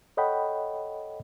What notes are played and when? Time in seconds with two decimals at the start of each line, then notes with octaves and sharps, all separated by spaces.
0.17 A4 C#5 D#5 F#5 G5 B5